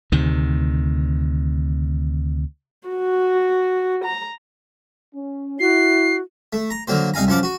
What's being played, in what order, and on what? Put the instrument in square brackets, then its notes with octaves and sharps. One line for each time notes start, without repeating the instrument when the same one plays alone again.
[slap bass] D2 C3 D#3
[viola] F#4
A#5
[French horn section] C#4
[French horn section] E4 [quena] F#4 [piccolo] C7
[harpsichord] A3
A#5
D3 F#3 A#3 C5
C2 D#4 F5 G#5 A#5
F#2 F3 F#5 D6
F#4